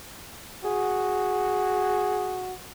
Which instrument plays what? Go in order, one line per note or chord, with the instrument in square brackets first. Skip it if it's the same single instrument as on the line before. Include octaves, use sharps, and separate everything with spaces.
[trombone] F#4 [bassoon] G#4